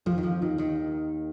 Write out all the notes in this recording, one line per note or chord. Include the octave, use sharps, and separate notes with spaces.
F2 F3
D#3
F2 F3
D#2 D#3
D#2 D#3